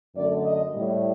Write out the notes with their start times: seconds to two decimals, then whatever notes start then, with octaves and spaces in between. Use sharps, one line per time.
0.15 F#2 D3 A3 D5
0.43 D#5
0.71 A2 G3